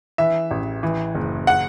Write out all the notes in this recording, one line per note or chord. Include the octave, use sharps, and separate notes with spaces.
E3 E5
A1
E3
F#1
F#5